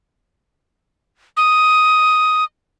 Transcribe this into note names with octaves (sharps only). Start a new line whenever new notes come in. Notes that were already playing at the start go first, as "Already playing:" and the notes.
D#6